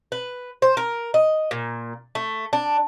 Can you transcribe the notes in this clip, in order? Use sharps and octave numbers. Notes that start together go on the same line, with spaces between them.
B4
C5
A#4
D#5
A#2
A3
D4